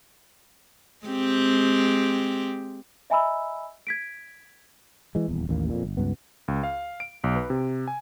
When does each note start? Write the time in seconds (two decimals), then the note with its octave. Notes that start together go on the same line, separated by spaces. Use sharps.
1.05 G#3 C4 G4
3.10 D#5 E5 G#5 A#5 B5 E6
3.87 G#6 B6 D7
5.15 E3 G#3
5.28 D#1 E2
5.49 A1 D#2 A#3
5.70 F2 A#2
5.83 G1
5.97 C#2 G2 B3
6.48 C#2
6.63 F5
7.00 D7
7.24 B1
7.36 B4
7.50 C3
7.88 G#5